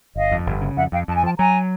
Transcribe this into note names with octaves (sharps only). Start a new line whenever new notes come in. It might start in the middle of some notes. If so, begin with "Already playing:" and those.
G1 D#5 F5
F2
G1
C#3
F2 E5 F#5
F2 F5 G5
F2 A5
G#5
F3 G5 A5
F#3 G#5 A#5